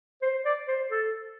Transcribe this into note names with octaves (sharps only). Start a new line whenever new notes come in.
C5
D5
C5
A4